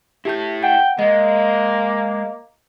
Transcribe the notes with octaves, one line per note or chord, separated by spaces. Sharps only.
E4 G4 A4 G6
F#5 G5
G#3 A#3 D#5